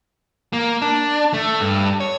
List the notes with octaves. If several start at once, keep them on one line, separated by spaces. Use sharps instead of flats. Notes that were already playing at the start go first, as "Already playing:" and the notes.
A#3
D4
A3
G2
C#5